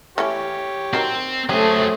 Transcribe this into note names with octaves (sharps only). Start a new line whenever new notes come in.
E3 A3 C#4 G4 C#5
F#3 C4 D#4 A#4
F#3 A3 C4 C#4 G4 G#4 D#6